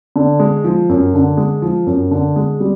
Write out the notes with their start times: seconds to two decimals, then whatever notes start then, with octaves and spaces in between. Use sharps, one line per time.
0.16 D3
0.40 G#3
0.64 F3
0.89 F#2
1.14 D3
1.37 G#3
1.62 F3
1.86 F#2
2.11 D3
2.36 G#3
2.60 G3